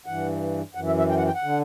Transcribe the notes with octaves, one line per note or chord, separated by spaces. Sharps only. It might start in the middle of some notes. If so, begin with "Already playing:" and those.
G2 E3 F#5
F#2 E3 F#5
E5
E5
G5
F#5
G5
F#5
D3